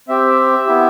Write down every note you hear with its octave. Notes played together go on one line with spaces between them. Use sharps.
C4 G4 E5
B3 E4 G4